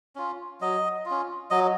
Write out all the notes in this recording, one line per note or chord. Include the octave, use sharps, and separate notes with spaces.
C#4 F4
F#3 D#5
C#4 F4
F#3 D#5